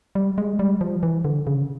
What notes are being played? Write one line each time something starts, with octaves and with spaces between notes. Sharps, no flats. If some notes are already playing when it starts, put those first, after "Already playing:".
G3
G#3
G3
F3
E3
D3
C#3